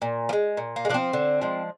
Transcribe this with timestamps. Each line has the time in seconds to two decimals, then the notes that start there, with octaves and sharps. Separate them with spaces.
0.02 A#2
0.29 F3
0.33 G#3
0.57 A#2
0.76 A#3
0.85 G#3
0.89 F3 D4
0.94 C4
1.13 D3
1.41 F3 G#3